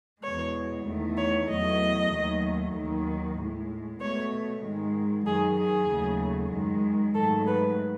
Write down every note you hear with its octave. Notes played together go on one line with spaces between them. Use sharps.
E2 B2 G#3 C#5
E2 D#3 A3
C#5
E2 B2 F#3 A3 D#5
D#2 D#3 F#3 A3
D#2 D#3 F#3
A2 G#3
B2 A3 C#5
G#2 D#3 G#3
F#2 D#3 F#3 G#4
G#4
D#2 C#3 F#3 A3
F#2 D#3 G#3
G#2 D#3 F#3 A3 A4
B4